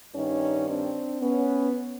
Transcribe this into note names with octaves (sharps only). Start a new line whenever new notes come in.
G2 D#3 C#4 D#4
C4 D4
B3 C#4